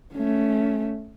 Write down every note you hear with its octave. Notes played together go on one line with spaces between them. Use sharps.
A3 C#4